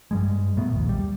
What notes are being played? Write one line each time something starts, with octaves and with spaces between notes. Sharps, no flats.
G2 G3 G#3
A#2 A3 B3
A#1 D#2
G3